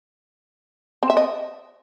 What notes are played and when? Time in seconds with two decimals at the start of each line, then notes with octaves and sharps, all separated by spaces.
1.03 C4
1.10 E5
1.17 D#5